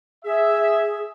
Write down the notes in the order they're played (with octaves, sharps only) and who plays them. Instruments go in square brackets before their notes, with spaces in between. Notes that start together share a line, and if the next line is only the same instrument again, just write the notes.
[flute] G#4 [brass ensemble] E5